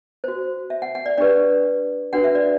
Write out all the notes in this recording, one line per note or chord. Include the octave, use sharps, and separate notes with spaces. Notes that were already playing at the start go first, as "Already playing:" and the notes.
F#4 C5
E5
F#5
F#5
D5
D4 G4 B4 D5
D4 F#4 B4 F#5
E5
D5